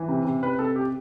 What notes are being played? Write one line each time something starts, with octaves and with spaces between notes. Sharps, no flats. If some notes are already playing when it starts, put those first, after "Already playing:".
Already playing: E3
C3
C3
C3 B4
C3 A4
G4